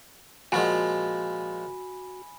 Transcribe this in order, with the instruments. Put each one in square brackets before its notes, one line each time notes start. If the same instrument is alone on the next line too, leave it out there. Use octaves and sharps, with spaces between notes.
[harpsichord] A#2 F3 G#3 [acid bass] F#4 [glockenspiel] G#5 B5